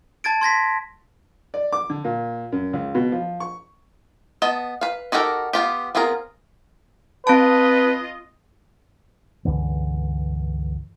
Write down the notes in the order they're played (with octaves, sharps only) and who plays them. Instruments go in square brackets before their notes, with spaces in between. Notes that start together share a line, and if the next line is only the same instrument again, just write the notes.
[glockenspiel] A5 G#6 A6 D7
C6 G#6 A#6 B6
[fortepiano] D5
D6
D3
A#2
F#2
C#2
B2
F3
C#6
[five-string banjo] B3 D#5 A5
B4 F5
D#4 F#4 G4 A4 A#4
B3 F4 G4
B3 C4 F4 G#4 A#4
[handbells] C4 A5 [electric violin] F4 D#5 [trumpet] B4
[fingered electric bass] C#2 G2 D3 E3